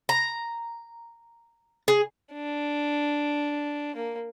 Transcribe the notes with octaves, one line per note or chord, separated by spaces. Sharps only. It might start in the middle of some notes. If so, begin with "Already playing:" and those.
A#5
G#4
D4
A#3